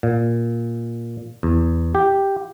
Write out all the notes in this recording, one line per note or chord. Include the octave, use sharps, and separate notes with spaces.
A#2
E2
G4